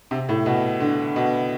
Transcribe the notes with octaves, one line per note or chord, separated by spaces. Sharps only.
C3
A2
B2
D3
B2